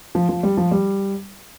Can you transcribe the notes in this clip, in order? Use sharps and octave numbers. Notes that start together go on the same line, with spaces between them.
F3
F3
G3
F3
G3